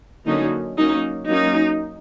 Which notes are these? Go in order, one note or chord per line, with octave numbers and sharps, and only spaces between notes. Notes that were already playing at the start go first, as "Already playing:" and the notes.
D3 F#3 A#3 C#4 D#4
F#3 A#3 C#4 D#4
F#3 A#3 C#4 D#4